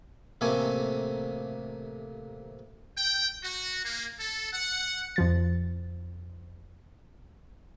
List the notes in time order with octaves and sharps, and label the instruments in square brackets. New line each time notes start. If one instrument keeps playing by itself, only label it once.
[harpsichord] A1 C3 A3 A#3 C4 G#5
[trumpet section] G5
F#4
A#3
A4
F#5
[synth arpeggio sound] F2 F3 A6